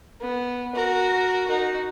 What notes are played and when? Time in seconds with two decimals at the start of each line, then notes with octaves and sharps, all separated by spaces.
0.21 B3
0.75 F#4 A#4
1.48 D#4 F#4